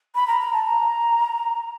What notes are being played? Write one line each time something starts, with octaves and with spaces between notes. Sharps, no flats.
B5
A#5
A#5
A5
A#5